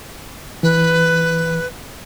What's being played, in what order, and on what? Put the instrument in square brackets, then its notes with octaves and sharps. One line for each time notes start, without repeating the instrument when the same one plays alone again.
[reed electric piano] E3 [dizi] B4